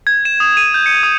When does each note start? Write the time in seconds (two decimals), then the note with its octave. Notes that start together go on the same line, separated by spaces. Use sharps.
0.07 G#6
0.25 E7
0.40 D#6
0.57 D#7
0.74 G6
0.86 C#7
1.03 D#6